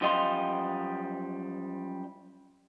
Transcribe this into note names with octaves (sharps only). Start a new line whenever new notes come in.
F#2 F3 G3 D#5 F5 C6